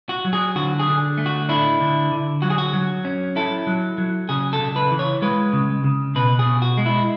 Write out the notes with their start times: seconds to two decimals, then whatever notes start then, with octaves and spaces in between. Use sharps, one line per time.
0.09 F#4
0.25 F#3
0.33 G#4
0.56 D3 F#4
0.80 G#4
0.88 D3
1.18 A3
1.26 F#4
1.49 D4 E4
1.81 D3
2.12 D3
2.42 F#3 F#4
2.50 G#4
2.58 F#4
2.73 F#3
3.05 C#4
3.36 E4 A4
3.67 F#3
3.98 F#3
4.29 C#3 G#4
4.53 A4
4.60 C#3
4.76 B4
4.91 E3
4.99 C#5
5.22 G#3 B4
5.53 C#3
5.84 C#3
6.15 B2 B4
6.39 G#4
6.46 B2
6.62 F#4
6.77 G#3
6.86 E4